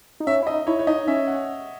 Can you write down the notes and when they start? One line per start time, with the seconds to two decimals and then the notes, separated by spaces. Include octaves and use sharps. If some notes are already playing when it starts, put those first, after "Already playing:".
0.20 D#4
0.27 C#4 E5
0.43 E4
0.47 D#4 D#5
0.67 E4 C#5
0.79 C#5
0.87 D#4 D#5
1.07 C#4 E5
1.27 F#5